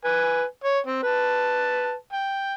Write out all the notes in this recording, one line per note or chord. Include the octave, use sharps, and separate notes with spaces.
B4 G#5
C#5
C4
B4 A5
G5